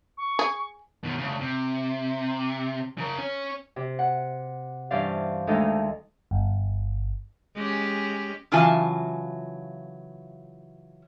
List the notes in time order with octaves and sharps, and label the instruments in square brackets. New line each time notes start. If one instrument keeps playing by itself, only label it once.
[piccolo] C#6
[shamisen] G#4
[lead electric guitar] B2 D#3
D2 C#3
C3
C#3 A#4
C#4
[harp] C3
F#5
G2 E3 C#4 C5 D5 F5
D2 D#3 G#3 D#4 A4 D#5
[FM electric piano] G1
[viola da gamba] G#3 C#4 G4
[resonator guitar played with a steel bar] C#3 E3 F#3 F4 G#5 A5